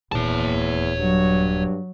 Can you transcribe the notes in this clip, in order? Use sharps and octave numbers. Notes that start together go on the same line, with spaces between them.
D#1 E2 C#5 A5
G2 F#3